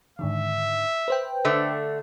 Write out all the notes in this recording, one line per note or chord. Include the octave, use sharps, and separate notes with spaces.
G#2 D3 D#3 E5
B4 C5 G5
D3 A3